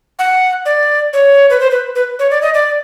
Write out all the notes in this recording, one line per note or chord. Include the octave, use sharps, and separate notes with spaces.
F#5
D5
C#5
B4
C5
B4
B4
C#5
D5
D#5
D5